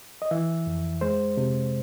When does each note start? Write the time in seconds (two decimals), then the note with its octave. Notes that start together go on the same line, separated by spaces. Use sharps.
0.22 D#5
0.31 E3 E5
0.67 F2
1.01 G#3 C5
1.37 C3